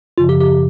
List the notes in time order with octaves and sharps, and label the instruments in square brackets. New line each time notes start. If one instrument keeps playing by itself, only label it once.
[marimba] F#2 C#3 F3 [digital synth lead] F4
[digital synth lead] G4
G4